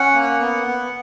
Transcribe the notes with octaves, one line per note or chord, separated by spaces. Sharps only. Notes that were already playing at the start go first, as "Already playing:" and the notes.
Already playing: C#4 F#5
A#3
B3
B3